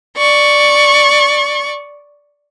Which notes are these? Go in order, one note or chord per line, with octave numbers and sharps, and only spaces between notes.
D5 C#6